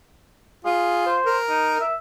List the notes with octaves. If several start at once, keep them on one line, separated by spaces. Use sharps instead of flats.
F4 G#4
C5
A#4
D#4
E5